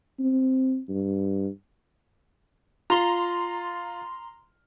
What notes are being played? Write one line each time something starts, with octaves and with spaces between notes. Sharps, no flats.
C4
G2
F4 A#5 C6